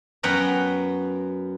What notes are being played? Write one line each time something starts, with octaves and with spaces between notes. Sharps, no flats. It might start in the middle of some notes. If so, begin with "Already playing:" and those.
F#2 B3 B4 F#5 G5 A#5